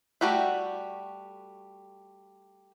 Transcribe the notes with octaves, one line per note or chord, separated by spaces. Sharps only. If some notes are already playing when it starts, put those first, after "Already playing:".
G3 A3 F#4 G4 E5